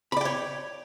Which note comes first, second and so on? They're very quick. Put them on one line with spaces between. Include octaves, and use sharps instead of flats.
B5 D5 G5 C#5